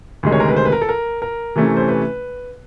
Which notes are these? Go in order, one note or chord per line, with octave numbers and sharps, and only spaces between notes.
D2 C3 D#3 G#3
C#5
A#4
B4
C5
B4
A#4
A4
A#4
A#4
C3 E3 A3 C#4
C5
B4